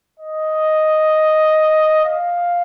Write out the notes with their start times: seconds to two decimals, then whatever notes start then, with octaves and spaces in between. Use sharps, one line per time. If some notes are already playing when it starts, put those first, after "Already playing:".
0.20 D#5
2.06 F5